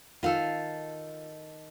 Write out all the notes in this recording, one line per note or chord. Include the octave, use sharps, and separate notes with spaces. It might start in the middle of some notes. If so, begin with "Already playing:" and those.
D#3 F4 A4 F5